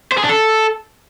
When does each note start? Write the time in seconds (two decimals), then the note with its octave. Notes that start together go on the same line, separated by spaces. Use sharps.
0.12 C5
0.18 G#4
0.24 D4
0.29 A4